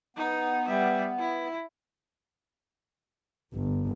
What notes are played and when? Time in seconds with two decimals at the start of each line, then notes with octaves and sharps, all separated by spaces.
0.17 B3 D#4
0.66 G3 E5
1.19 E4
3.53 G1